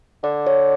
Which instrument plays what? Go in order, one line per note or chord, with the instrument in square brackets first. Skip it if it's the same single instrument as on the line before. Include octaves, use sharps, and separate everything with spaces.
[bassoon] D3 [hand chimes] D5
[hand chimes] C#5